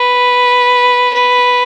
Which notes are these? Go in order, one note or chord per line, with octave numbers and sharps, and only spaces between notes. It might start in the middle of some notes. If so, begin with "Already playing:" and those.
Already playing: B4
B4